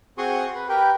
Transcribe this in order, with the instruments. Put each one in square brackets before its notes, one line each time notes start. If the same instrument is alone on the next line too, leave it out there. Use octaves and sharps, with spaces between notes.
[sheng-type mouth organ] C4 F#4 G#4 C6 C#6 D#6
B4
G4 A#4 B4 G5